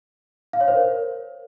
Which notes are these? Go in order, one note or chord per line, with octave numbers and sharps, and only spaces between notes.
F5
C#5
C5
A#4